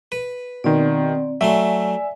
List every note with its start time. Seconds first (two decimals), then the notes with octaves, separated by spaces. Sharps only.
0.12 B4
0.64 B2 D#3 C4 D5
1.41 F#3 A3 D5 E5 G#5 C6